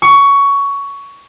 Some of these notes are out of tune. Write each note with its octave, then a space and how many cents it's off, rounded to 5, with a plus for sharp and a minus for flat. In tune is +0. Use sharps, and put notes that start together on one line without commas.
C#6 +15